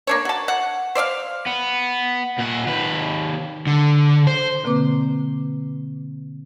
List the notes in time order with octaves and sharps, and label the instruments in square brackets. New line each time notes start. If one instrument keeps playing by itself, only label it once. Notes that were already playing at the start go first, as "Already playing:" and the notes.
[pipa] A#3 D4 C#5
F#4 A5
F#5
C5 D5 E5 F5
[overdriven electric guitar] B3
A#2 F#5
D#2 B4
[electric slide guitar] D3
C5
[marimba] B2 D3 A#3 C4 B4 D6